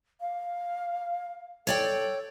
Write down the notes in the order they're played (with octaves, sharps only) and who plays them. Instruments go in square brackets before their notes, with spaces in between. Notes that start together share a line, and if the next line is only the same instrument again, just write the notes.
[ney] F5
[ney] A4 [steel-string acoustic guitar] C#5 D5 G5